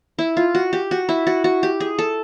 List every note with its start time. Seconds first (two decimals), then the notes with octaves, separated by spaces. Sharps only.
0.19 E4
0.37 F4
0.55 F#4
0.73 G4
0.91 F#4
1.09 E4
1.27 F#4
1.44 F#4
1.63 G4
1.80 G#4
1.99 A4